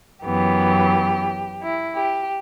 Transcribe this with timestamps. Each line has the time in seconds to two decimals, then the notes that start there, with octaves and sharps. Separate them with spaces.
0.24 F#2 E3 B3 G4
1.61 E4
1.96 G4